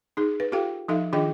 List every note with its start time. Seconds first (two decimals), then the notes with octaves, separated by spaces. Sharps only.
0.17 D#4 G#4
0.40 B4
0.52 F4 G4 A4 F5 G5
0.88 F3 D#4 A4 E5 F5
1.13 D#3 D4 F4 G#4 D#5 G5